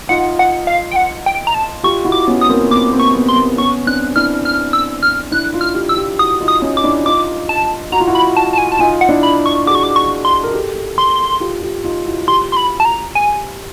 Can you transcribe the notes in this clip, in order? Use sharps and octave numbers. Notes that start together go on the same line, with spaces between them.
D#4 F4 F#5
F#5
F5
G5
F#5
G5
A#5
A5
F4 G4 C#6
E4 F#4
D6
B3 C#4
D#6
A#3 C4
B3 D6
A#3 C4
C#6
B3
C6
A#3 C4
B3 C#4 C#6
C4 D4 F#6
D4 E4 F6
F6
E6
F6
D4 E4 F#6
D#4 F4
F6
F4 G4
E6
F4 G4
E4 F#4 D#6
D#4 F4
D#6
C#4 D#4
D6
D4 E4
D#4 F4 D6
A5
F#4 A#5
F4
E4 F#4
B5
A5
A5
G#5
A5
D#4 F4 G#5
F#5
D4 E4
B5
C#6
F#4 G#4 D6
C#6
D6
C#6
C6
A#4
G4 A4
C6
F4 G4
F4 G4
D#4 F4
E4 F#4
F4 G4 C6
C6
B5
A5
A#5
G#5